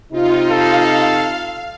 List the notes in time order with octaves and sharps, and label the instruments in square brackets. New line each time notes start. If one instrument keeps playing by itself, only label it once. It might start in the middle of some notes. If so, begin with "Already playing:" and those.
[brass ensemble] C3 D#4 [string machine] F4
[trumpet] A4 [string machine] F5